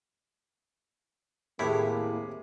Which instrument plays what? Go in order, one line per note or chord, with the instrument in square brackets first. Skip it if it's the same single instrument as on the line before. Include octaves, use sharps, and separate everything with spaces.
[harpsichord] D#2 C3 E5 [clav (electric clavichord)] A2 E4 G4 [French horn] A#3 [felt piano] G#4